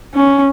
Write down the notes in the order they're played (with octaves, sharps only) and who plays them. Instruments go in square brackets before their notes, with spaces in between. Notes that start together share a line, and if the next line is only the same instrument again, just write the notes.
[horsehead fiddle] C#4